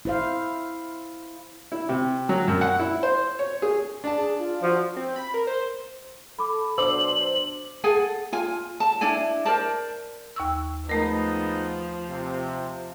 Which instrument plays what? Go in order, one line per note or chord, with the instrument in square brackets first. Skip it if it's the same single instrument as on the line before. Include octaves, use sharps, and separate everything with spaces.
[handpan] E4 C5 F5
[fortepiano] E4
C3
F#3
F#2
F#5
E4
C5
C#5
G#4
D4 A5
[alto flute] G#4
F4
[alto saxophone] F3 [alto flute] F#4
[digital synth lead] C4
B5
A#4
C5
[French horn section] A4 [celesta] B5 D6
[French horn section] B2 F#3 D4 [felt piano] C5 [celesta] D6 E6 [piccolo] F#7
[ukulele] G#4 A4 F#5 G#5
F4 G#5
A5
D4 E4 D5 G#5
A#4 C5 D5 A5
[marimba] D#2 C#6 E6
[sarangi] F3 [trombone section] G#3 B3 D#4 [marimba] A3 A#4
[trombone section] C3